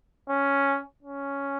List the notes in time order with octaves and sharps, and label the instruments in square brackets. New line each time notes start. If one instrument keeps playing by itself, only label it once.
[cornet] C#4
C#4